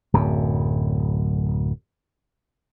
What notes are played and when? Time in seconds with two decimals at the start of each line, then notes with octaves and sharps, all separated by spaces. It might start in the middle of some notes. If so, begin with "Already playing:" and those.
0.13 D1 F#2